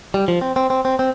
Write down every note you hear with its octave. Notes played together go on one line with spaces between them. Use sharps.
G3
F3
C4
C4
C4
C4
C4